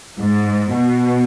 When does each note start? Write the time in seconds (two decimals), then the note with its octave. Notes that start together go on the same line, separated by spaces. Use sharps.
0.19 G#2
0.75 B2